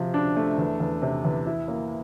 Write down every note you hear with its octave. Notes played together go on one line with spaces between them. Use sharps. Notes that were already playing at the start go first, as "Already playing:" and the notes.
Already playing: C3 F3
D4
A3
E2
E2
C3
E2
E4
A#3